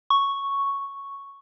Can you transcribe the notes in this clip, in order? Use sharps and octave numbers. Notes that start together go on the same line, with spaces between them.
C#6